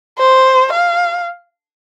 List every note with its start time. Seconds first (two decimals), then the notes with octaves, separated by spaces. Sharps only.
0.18 C5
0.72 F5